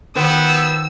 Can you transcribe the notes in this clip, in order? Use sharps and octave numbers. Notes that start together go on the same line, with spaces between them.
D#3 F3 F#3 B3 C5 E6